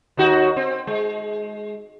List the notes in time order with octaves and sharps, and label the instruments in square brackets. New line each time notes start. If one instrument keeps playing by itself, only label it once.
[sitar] D#2 D#4 F#4
C4
G#3